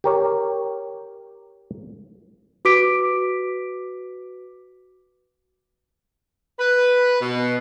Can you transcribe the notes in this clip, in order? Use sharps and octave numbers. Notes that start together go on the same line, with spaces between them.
G4 A#4 C#5
F#4 B4 D6 B6 D7
B4
B2